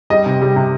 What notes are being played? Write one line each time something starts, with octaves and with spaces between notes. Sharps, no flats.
G3 D#5
C3
G3
C3